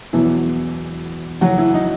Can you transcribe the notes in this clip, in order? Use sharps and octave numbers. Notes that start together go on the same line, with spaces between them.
E1 E2 B2 E3 F#3 B3 E4
F#1 F#2 E3 F#3 F#4
E3 E4
D#4